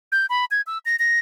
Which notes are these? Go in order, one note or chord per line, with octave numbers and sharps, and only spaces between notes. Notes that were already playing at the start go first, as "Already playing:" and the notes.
G6
B5
G#6
E6
A#6
A#6